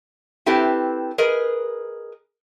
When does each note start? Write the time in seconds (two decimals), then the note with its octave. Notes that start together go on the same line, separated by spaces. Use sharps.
0.46 C4 E4 G4 A4 B4 C5
1.18 G#4 A#4 B4 D#5